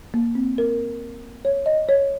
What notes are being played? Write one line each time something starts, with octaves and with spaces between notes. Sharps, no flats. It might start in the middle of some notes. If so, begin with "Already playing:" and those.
A#3
C4
A#4
C#5
D#5
C#5